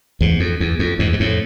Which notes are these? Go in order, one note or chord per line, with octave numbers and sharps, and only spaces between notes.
E2 G#2
F2
E2
F2
E2 G#2
G#2
F2 A2